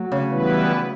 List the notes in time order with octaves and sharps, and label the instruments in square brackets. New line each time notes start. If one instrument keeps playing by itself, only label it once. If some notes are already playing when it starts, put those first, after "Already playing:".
Already playing: [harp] F#3 A3
C#3
[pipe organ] E3 G3 B3 E4 B4